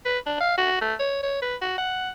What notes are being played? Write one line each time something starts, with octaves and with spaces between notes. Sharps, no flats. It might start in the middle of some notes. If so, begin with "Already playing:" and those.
B4
D4
F5
F#4
A3
C#5
C#5
B4
F#4
F#5